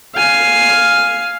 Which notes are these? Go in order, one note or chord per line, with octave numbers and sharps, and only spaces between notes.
F5 G#5